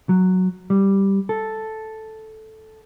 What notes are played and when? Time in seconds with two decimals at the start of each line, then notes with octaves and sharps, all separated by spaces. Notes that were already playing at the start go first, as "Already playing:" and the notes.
0.09 F#3
0.70 G3
1.29 A4